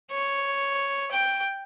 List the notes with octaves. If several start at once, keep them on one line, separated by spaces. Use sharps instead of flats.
C#5
G5